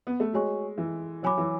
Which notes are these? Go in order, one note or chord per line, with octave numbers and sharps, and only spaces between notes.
B3
A3
G#3 F#4 C#5 G#5 C#6
E3
F#3 C#5 G#5 B5 D6
E3